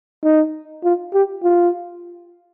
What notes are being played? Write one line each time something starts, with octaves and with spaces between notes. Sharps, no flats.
D#4
F4
G4
F4